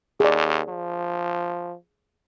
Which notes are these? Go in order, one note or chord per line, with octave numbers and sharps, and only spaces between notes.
D#2 G#4 D5
F3